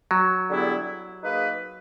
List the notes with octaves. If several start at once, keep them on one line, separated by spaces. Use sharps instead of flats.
F#3
D3 G3 B3 E4 G#4
A#3 D#4 G#4 B4